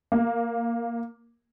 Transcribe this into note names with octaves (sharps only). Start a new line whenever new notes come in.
A#3